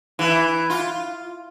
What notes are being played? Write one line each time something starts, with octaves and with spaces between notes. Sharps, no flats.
E3
F4